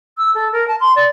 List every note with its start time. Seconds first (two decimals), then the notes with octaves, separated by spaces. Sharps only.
0.18 E6
0.35 A4
0.52 A#4
0.68 A5
0.80 C6
0.96 D5